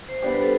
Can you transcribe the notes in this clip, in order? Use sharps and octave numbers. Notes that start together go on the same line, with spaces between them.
C5
G3 B3 D4 G4 C5
B4
A4